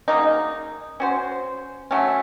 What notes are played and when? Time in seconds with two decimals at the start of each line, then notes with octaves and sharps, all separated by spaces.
0.08 C#3 F#3 A#3 D#4
1.00 C#4 F#4 C5
1.91 F#3 A3 C#4